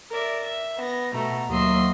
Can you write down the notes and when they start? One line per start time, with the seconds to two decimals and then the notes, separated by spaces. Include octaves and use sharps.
0.10 A#4 D5 E5
0.43 E5
0.77 B3 A#6
1.13 B2 A3 A#5
1.49 D#2 F#3 D#5 E5 C6